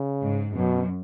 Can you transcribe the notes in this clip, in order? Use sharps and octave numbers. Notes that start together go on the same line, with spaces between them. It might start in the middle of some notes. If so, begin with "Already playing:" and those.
Already playing: C#3
G#2
F#2 B2